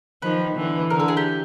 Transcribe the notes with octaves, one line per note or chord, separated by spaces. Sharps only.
D#3 F3 B4
D3 E3
D3 A#4
A4
G#4
G4